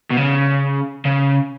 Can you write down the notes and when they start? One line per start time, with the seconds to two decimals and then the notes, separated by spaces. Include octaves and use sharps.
0.11 B2
0.17 C#3
1.05 C#3